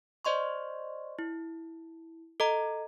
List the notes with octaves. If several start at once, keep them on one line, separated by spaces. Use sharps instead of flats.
C5 D5 D#5 C6 C#6
E4
A4 D#5 A#5